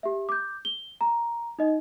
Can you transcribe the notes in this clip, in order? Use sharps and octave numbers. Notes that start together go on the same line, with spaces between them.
G4 E5
D6 G6
G7
A#5
D#4 D#5